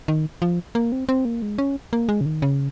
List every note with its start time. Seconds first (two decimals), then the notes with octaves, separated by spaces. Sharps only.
0.08 D#3
0.42 F3
0.75 A#3
0.92 C4
1.09 C4
1.25 A#3
1.42 G#3
1.58 C#4
1.93 A#3
2.09 G#3
2.21 C#3
2.26 D#3
2.42 C#3